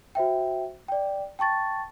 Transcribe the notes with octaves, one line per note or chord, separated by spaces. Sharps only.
F#4 C5 E5 G5
D5 G5
G5 A5 C#6 A6